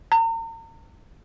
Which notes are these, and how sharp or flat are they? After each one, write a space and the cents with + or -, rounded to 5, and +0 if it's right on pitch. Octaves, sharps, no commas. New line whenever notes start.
A#5 -40